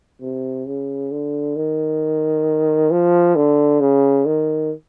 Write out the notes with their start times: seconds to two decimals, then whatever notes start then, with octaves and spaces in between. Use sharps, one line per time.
0.22 C3
0.67 C#3
1.11 D3
1.56 D#3
2.91 F3
3.36 D3
3.80 C#3
4.26 D#3